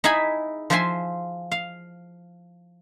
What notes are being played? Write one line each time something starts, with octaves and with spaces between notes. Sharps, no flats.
D#4 E4 G#4 E5 G#5 B5
F3 F4 C5 E5 G#5 C6
F5